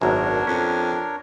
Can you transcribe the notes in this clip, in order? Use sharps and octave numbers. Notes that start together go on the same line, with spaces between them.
G#1 F#2 B2 D4 A#4 C#5
F2 C#4